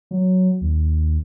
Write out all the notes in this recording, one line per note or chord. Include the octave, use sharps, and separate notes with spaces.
F#3
D#2